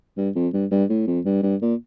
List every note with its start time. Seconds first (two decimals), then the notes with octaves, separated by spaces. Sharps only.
0.17 G2
0.35 F2
0.53 G2
0.72 G2
0.90 A2
1.07 F2
1.26 G2
1.43 G2
1.62 A#2